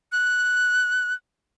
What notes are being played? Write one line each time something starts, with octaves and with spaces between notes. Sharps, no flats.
F#6